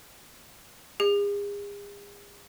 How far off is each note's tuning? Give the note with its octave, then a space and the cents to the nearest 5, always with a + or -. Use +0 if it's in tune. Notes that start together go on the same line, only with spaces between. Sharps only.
G#4 -40